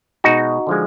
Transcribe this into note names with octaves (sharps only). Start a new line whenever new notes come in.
B2 G#3 D#4 F#4
D3 F3 G#3